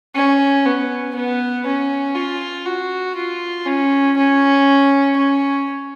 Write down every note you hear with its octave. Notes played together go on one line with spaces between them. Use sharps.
C#4
B3
B3
C#4
F4
F#4
F4
C#4
C#4
C#4